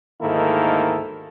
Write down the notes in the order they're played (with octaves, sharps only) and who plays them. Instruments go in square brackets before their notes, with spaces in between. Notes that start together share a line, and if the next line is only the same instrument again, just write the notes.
[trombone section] D2 G#2 D#3 A#3 E4 A4